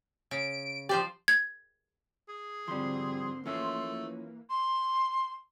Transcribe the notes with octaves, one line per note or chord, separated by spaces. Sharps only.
C#3 D7
F3 G4 C5 D5
G#6
G#4
G#2 D3 F3 G3 C4 C6
E3 F3 A3 A#3 C#4
C6